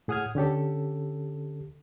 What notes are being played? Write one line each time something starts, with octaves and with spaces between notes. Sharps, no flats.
A2 G#4 F#5 D#6 F6 G#6
D3 C#4 G4 A4